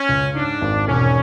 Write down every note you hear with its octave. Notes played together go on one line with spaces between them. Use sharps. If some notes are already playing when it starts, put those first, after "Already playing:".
Already playing: C#4
C#2
G#2 D4
G#1
E1 C#4